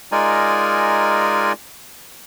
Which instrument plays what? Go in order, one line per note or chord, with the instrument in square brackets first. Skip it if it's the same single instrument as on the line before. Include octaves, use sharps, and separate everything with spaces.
[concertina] G#3 D#4 F4 A#4 D5 G#5